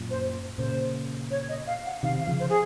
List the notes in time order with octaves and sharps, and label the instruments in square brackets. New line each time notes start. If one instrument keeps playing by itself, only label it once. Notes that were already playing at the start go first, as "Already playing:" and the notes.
Already playing: [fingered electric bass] F#2 A#2
[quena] C5
[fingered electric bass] A#2 C#3 [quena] C5
[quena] C#5
D#5
F5
F#5
[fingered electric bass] C3 D#3 [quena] F5
[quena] F5
[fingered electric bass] C#3 F3
[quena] C5
G#4